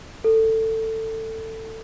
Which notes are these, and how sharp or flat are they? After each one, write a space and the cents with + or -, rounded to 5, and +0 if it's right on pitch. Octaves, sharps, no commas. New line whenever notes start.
A4 +15